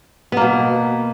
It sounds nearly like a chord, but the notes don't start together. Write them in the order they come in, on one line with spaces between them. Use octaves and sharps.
B3 A#3 B2